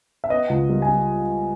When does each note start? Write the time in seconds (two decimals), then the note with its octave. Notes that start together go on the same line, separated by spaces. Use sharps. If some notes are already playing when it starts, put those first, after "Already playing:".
0.24 E5
0.30 B3 D#5
0.50 C#2
0.69 G3
0.82 G#5
0.89 G3